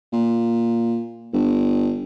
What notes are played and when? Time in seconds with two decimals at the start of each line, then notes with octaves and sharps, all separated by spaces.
0.12 A#2
1.33 G1